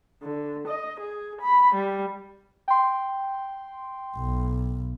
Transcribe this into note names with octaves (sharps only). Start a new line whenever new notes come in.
D3
D#5
G#4
B5
G3
G5 C6
B1